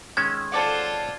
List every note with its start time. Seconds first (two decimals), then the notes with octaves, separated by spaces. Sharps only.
0.17 D#3 G#3 C#4 E6 G#6
0.52 F4 A4 C5 D5 F#5